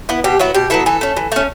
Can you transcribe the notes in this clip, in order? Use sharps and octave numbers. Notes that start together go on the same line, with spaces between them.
B3 E4
B2 G4
F#3 B3 E4 F#4
B2 G4
F#3 B3 E4 A4
E3 A4
A3 C#4
E3
A3 C#4